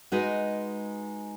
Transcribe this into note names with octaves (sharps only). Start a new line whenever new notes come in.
G#3 D#4 F#4 B4 D#5